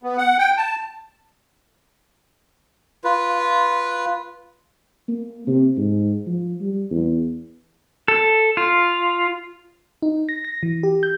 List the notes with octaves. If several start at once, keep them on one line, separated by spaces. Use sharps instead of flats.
B3
F#5
G5
A5
F4 B4
A#3
C3
G#2
F3
G3
E2
A4
F4
D#4
A#6
A#6
E3
G4
G6